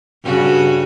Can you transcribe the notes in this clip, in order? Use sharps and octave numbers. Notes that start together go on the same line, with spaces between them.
G2 C#3 F#4